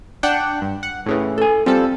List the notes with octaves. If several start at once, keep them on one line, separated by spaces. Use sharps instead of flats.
D4 F#5 G5
G2
F#5
A2 C#3 E3
A4 G#5
F3 G3 C4 A4